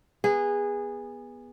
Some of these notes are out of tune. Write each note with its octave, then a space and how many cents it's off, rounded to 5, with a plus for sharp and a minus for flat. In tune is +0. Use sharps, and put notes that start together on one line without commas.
B3 -15 G#4 -20